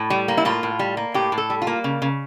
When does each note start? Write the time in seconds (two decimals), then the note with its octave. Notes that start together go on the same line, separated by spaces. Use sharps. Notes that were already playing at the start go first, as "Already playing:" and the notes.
Already playing: A2
0.10 G3
0.28 A#3
0.37 E4
0.45 A2 F4
0.63 A2
0.79 G3
0.97 A#3
1.14 A2 G4
1.32 A2
1.38 A4
1.50 G3
1.62 F4
1.67 A#3
1.84 C#3
2.02 C#3